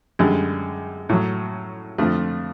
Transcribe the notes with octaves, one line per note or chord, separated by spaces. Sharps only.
F#2 D3 G3 G#3
A2 F#3
F2 D3 F3 A3